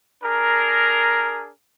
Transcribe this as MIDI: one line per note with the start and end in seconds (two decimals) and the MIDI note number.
0.23 1.50 62
0.23 1.50 68
0.23 1.50 70